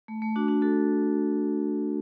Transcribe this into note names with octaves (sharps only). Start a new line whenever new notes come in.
A3
A3
D4 F#4
D4 F#4
F#4 A4